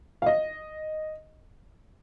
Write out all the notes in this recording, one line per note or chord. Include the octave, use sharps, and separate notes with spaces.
F5
D#5